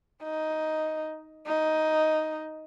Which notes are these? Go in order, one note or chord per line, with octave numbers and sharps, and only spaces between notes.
D#4
D#4